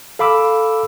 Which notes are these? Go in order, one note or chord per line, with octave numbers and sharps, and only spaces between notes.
A4 F5 B5 D6 E6